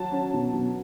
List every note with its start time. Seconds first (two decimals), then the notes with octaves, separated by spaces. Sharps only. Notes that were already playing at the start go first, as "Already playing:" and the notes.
Already playing: F#3 A5
0.12 C#4
0.34 B2
0.53 B2